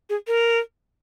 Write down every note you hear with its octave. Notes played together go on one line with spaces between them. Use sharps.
G#4
A#4